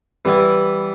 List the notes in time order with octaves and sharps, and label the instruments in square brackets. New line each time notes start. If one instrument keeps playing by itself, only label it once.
[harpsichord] E3 B3 E4 [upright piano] G3